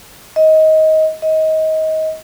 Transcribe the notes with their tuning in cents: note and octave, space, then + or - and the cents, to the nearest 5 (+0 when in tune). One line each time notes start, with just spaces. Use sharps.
D#5 +20
D#5 +25